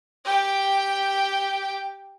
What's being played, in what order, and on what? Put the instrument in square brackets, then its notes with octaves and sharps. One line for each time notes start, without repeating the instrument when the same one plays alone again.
[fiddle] G4 G5